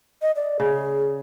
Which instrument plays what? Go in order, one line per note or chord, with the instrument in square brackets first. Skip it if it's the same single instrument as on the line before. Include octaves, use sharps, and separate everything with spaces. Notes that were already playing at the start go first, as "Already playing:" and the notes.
[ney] D#5
D5
[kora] C#3 [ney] G#4